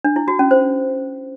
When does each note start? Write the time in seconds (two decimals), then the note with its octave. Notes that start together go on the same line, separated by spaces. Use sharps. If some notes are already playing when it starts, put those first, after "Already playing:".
0.04 D4
0.16 E4
0.28 F#4
0.39 C#4
0.51 C5